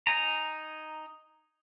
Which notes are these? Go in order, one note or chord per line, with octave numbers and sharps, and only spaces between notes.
D#4 G#5 A#5